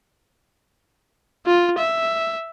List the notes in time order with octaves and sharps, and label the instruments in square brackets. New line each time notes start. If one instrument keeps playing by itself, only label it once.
[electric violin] F4
E5